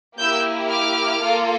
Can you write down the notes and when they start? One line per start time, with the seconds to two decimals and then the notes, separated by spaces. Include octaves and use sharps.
0.20 A#3 E4 G4 E6 G6
0.72 D6 F6
1.24 A#3 F4 A4